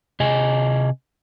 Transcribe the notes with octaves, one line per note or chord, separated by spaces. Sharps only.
C3 G#4 D#5 G#5